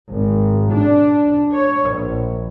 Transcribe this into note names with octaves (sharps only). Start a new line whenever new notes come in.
G#1
D4
C#5
A#1